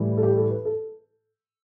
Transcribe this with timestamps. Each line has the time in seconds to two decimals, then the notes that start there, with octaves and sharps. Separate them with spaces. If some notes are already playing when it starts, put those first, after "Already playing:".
Already playing: A2 E3 G3
0.18 A4
0.23 G4
0.37 A4
0.50 B4
0.65 A4